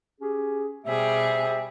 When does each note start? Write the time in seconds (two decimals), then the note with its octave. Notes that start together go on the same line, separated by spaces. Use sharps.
0.21 C#4 G4 G#4
0.86 B2 G3 G4 G#4 C5 E5